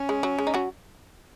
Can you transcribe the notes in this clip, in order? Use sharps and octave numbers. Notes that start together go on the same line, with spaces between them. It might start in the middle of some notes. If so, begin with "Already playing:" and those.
Already playing: C#4
G#3
F#3
G#3
D#4
F#3 F#4